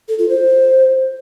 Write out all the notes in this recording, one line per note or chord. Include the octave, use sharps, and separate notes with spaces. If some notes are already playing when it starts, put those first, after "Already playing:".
A4
F4
C5